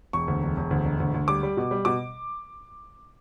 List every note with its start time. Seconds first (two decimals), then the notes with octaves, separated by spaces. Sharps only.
0.13 E1 C#6
0.28 D2
0.43 E1
0.57 E1
0.71 D2
0.85 E1
1.00 D2
1.14 D2
1.28 G3 D6
1.43 G3
1.57 B2
1.71 G3
1.85 B2 D6